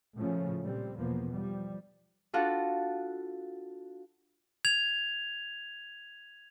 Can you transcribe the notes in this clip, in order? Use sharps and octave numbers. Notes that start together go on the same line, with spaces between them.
A2 C#3 F3 A3 C#4
A#2 G3 C4
E2 B2 F3 A#3 B3
F3 G3
D4 F4 F#4 A4
G#6 F7